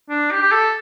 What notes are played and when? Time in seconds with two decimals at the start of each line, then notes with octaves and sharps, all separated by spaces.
0.10 D4
0.31 G4
0.42 G4
0.52 A4